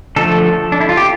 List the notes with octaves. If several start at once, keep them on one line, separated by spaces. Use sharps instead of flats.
D3 F3 A3 A4
D4
E4
F4
G4